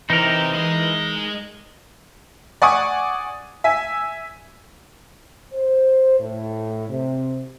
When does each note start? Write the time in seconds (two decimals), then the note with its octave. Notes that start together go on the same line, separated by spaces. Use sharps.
0.10 E3 C4 D#4 G4 A#4
0.55 G#3 D#5
2.62 D5 F#5 G#5 C#6 D#6
3.64 E5 G#5
5.53 C5
6.19 A2
6.89 C3